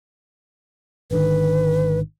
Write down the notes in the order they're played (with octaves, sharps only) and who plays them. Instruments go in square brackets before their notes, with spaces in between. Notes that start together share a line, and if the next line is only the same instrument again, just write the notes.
[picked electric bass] G#1 D3 D#3 [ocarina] B4